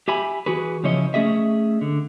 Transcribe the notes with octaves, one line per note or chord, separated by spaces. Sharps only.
G4 E5 G#5 B5
E3 F#4 G#4 B4
C#3 F3 C#4 E4 C#5 D#5
A3 C#4 G#4 D#5 E5
D3